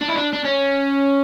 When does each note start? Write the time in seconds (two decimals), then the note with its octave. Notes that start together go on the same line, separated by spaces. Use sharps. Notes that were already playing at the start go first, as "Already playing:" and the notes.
0.01 D4
0.08 E4
0.15 D4
0.33 D4
0.44 C#4